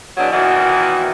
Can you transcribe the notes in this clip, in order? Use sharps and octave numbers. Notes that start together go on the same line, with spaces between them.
E2 B2 F#3 B3 D4
A#2 D#3 E3 B3 F#4